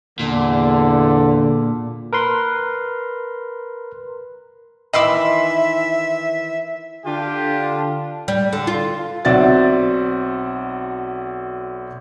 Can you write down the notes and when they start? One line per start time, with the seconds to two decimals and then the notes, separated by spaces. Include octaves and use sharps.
0.19 E2 A#2 D3
2.13 A#4 B4 C6
4.93 D#3 E3 D#5 E5 B5 C6 D6 E6
7.06 D3 D4 F4 G4
8.28 G3
8.53 D3
8.67 F4
9.25 B1 C4 F#4 D5 E5 A6